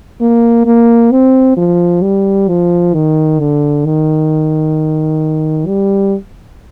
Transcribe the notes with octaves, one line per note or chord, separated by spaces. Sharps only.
A#3
A#3
C4
F3
G3
F3
D#3
D3
D#3
G3